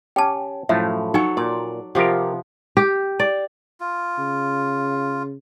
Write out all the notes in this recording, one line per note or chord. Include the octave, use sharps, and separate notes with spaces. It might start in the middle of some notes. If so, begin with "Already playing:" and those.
C#4 G4 G5 A5
F#2 A2 F3 A3 E5
F#3 D#4 A4 C#5 G#5
A#2 D5
C3 F3 B3 F4 G4 A#4
G4
D5
F4
C#3